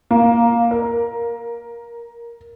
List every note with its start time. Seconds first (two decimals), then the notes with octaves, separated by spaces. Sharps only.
0.11 A#3
0.71 A#4